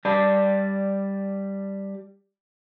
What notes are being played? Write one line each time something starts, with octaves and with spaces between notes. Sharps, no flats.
G3 D5 A5 B5